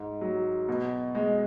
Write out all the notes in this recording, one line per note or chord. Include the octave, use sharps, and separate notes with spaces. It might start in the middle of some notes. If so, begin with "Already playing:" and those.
Already playing: G#2
F#3
B2
G#3